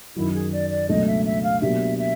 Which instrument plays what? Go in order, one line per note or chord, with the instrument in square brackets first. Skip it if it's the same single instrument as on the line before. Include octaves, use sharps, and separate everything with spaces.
[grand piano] F#2 D#3 F#3 [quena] E4
[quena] G#4
D5
D5
[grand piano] C#2 B2 F#3 A3 D4 [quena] D#5
[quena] E5
E5
F5
[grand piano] B2 F#3 A#3 D4 G4 [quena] E5
[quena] E5